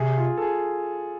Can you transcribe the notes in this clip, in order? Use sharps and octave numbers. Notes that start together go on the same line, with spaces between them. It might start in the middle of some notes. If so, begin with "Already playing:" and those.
Already playing: C3 G#4
F4
A4
G#4